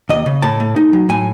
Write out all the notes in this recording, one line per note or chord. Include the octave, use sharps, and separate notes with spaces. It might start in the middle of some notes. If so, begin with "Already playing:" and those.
D#2 D#5
C#3
A2 A5
A3
D#4
F#3
A2 G#5